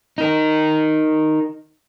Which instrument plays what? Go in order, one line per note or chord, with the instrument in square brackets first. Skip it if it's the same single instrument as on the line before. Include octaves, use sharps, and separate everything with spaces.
[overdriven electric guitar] D#4 A#4